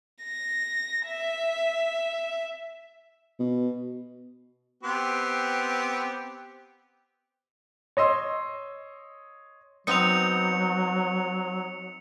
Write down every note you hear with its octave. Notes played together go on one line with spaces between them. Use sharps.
A#6
E5
B2
B3 C4 G4
C#5 D#5 C6 E6
F#3 B3 C4 D#4 C#7 F7